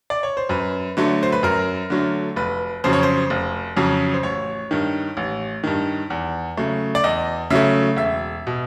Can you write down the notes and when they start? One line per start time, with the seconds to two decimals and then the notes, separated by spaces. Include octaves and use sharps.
0.10 D5
0.23 C#5
0.37 C5
0.49 F#2 B4
0.97 D3 F#3 A3
1.23 C5
1.32 B4
1.43 F#2 A#4
1.90 D3 F#3 A3
2.36 F1 B4
2.84 F2 C#3 F#3 C5
2.93 C#5
3.03 C5
3.30 F1
3.77 F2 C#3 F#3
4.14 C5
4.23 A1 C#5
4.71 G2 D#3
5.17 A1
5.64 G2 D#3
6.10 E2
6.57 C#3 F#3 A3
6.95 D5
7.04 E2 D#5
7.50 C#3 F#3 A3 E5
7.97 E1 E5
8.47 B2